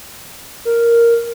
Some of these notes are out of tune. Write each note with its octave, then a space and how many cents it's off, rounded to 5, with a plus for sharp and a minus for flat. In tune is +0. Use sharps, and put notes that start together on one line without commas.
A#4 +0